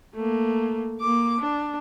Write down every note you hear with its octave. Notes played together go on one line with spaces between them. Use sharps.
A3 A#3
A#3 D6
D4